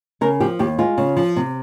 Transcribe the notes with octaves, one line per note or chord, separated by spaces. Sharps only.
C#3 A#4
F3 G4
D#2 G4
G#3 F4
C#3
F3
C3